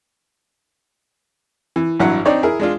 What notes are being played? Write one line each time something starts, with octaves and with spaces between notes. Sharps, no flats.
E3
A1 G2 F#3 E4 F#5 F#6
C4 D4 D#4 C#5 D5
E4 G#4 A#4
G#3 D4 F4